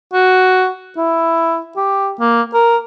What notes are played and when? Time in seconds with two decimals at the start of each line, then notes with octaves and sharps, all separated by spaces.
0.13 F#4
0.97 E4
1.77 G4
2.20 A#3
2.54 A#4